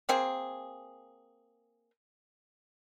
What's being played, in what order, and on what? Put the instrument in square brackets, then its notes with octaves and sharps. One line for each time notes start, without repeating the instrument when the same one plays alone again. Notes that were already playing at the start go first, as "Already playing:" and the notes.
[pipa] A#3 C4 G#4